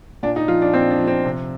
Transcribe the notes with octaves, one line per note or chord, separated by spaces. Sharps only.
A#2 D4
D#4
F3 F4
D4
A#2 C4
D4
F3
C4
C3